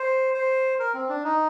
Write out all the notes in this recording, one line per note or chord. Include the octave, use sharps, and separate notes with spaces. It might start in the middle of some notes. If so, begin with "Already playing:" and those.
Already playing: C5
C5
A#4
C4
D4
D#4